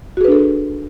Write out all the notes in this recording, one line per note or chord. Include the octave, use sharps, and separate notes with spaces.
D4 F#4 G#4 A4 B4